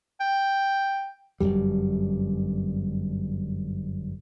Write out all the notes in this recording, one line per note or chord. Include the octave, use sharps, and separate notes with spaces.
G5
G1 C2 F#2 G3